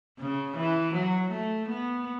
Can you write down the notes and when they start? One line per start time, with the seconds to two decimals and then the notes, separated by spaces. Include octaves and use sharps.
0.20 C#3
0.57 E3
0.94 F#3
1.31 A3
1.68 B3